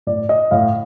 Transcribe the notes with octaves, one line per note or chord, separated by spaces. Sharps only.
A2 D5
D#5
A2 F5